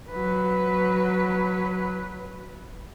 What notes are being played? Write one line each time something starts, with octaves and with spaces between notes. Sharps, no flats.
F#3 B4